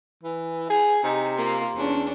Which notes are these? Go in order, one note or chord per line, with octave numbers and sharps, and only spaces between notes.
E3
G#4
C3 D#4
A#3 F4
E2 C#4 D4